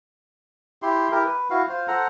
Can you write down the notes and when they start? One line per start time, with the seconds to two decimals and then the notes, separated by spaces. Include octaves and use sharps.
0.82 E4 G4 C6
1.12 E4 G4 A#4
1.25 B4
1.50 E4 F#4 F5
1.69 F4 C5
1.88 A4 C5 F#5 A#5